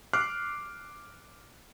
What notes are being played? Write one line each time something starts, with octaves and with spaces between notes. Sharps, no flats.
D6 F6 F#6 C7